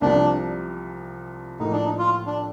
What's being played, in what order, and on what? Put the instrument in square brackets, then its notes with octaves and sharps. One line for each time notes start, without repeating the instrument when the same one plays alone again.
[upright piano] C2 C3 F3 [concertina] D4
[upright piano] A2 F3 A#3 [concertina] D#4
[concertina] D4
D#4
F4
D4